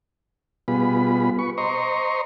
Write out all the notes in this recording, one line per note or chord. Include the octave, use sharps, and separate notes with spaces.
B2 G3 B3 F4 G#4 B5
B4 C#6
C5 D#5 A#5 C6 C#6